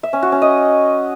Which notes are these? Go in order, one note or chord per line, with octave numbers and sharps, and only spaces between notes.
E5
C#4
F#4
C#4
D#5